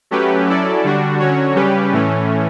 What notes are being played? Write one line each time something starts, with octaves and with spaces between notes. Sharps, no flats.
F#3 A3 C#4 G4 B4
F#3 C#4 E4 A4 D5
D3 G3 D4 F#4
D3 F#3 C#4 F#4 C#5
C#3 G3 C#4 G4 B4
A2 E3 A3 C#4